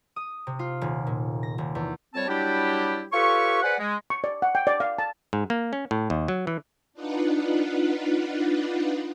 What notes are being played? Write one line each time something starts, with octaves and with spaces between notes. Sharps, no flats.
D#6
C3
F4
D#1
A#2
A#6
D#1
E2
F2 G3 C4 C#5 A5
F#3 G3 D4 E4 G4
F4 G4 A4 B4 C#5 C#6
G#4 B4 C5 D5 F#5
G#3
C#6
D5
F#5
G5
D5
F5
A5
G#2
A#3
C#4
A2
D#2
F#3
E3
D4 D#4 F4 B4 F#5